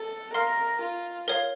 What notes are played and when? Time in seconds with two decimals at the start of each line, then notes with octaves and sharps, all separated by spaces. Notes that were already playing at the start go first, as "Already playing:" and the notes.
Already playing: A4
0.34 A#4 F5 C6 F6
0.81 F4
1.28 A#4 C#5 F5